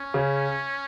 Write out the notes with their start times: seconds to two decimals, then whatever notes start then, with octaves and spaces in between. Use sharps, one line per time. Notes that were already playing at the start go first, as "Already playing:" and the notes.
Already playing: C#4
0.14 C#3